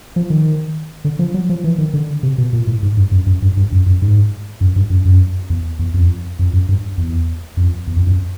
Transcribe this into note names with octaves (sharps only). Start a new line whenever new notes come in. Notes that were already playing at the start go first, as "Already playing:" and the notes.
F3
D#3
D3
F3
F#3
F3
E3
D#3
D3
C3
B2
A#2
A2
G#2
G2
F#2
F#2
G2
G2
F#2
F#2
G#2
F#2
G2
F#2
F#2
E2
E2
F2
F2
F#2
G2
E2
F2
E2
F2
F#2